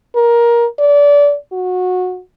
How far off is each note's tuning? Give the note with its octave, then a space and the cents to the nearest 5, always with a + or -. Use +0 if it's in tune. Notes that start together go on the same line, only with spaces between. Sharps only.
A#4 +15
D5 -25
F#4 -20